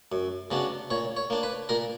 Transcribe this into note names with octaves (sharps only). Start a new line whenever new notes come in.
F#2
C#3 F#3 B3 D4
A#2 C#5
C#5
A#3 D4
B4
A#2 A#4